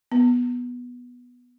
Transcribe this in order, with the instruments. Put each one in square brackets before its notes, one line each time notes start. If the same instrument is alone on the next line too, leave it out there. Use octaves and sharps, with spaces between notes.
[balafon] B3